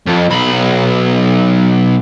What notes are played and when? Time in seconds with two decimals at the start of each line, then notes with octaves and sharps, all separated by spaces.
0.07 F2
0.30 B1 B5